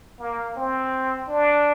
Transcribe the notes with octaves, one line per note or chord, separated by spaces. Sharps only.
A#3
C4
D4